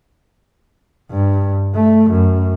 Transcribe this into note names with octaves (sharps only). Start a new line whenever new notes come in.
G2
A3
F#2